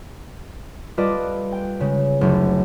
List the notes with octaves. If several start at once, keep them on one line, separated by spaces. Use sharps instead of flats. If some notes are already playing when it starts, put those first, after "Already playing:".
G3 F4 A4 B4 D5 D#5
G5
C#3 G#3
F#1 D2